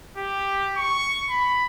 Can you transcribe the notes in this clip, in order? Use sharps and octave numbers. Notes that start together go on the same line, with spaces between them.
G4
C#6
B5